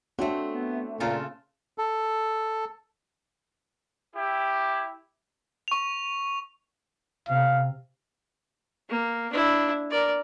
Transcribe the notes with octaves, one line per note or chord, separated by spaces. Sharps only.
A3 C4 D4 F#4 C#5
B3
A#2 C#3 F4 A4
A4
E4 G4
C#6 F7
C3 F5
A#3
D4 E4
A#4 D5